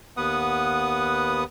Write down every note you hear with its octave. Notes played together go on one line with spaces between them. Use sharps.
D#2 B3 B4 F#5 D#6